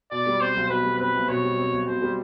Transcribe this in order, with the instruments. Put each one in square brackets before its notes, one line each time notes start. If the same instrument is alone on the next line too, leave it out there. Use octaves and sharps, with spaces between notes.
[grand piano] B2 [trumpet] D5
[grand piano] G3
[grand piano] C4 [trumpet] C5
[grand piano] B1
[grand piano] B2 [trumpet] B4
[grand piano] G3
[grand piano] C4 [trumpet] B4
[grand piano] B1
[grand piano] B2 [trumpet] C#5
[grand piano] G3
C4
B1
[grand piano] B2 [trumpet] C5
[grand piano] G3